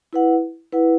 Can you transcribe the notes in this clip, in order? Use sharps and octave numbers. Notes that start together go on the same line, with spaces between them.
E4 B4 F#5
E4 B4 F#5